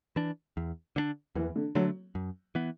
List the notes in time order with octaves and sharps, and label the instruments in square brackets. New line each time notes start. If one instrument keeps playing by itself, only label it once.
[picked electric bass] E3 D4
E2
D3 A3 D4
[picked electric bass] E2 [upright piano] E3
[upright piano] D3
[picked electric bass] D3 A3 D4 [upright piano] F#3
[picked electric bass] F#2
E3 B3